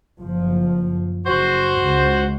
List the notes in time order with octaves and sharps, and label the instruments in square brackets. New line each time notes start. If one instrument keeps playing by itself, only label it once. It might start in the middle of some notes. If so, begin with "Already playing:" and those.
[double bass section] F#1 F3
[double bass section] F#1 [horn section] F#4 C5
[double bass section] C#2